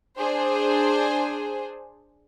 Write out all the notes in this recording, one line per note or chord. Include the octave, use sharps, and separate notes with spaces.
D4 G#4 C5